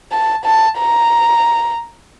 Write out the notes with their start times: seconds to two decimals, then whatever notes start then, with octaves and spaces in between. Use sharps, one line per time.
0.12 A5
0.45 A5
0.79 A#5